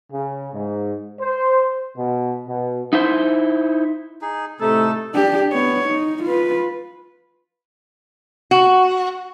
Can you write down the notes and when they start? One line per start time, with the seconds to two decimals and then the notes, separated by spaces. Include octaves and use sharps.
0.12 C#3
0.53 G#2
1.20 C5
1.97 B2
2.47 B2
2.93 D#4 E4 C5
4.22 D#4 G#4
4.60 A2 C3 A3 D#4 A4
5.14 D4 G4
5.52 B3 C#5
5.88 D#4
6.23 F4 B4
8.51 F#4